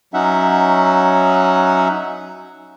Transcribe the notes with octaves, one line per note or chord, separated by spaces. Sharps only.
F#3 C#4 D#4 E5 F#5